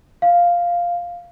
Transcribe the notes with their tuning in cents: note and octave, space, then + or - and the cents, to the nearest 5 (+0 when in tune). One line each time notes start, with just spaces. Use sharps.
F5 +0